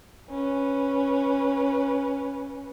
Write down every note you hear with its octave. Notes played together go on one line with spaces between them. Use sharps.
C#4 B4